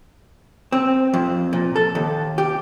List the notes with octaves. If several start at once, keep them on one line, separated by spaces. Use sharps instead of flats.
C4
F2
A#2
A4
D#2
G4